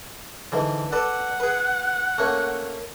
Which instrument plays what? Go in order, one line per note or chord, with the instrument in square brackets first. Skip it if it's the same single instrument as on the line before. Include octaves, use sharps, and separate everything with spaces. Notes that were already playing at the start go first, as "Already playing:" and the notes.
[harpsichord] G#2 D3 E3
[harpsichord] A4 B4 D5 [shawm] F#5
[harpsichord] G#4 B4
A3 A#3 C#4